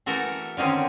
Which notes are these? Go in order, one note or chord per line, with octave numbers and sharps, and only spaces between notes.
E3 A3 F#4 A#4
D3 D#3 C4 C#4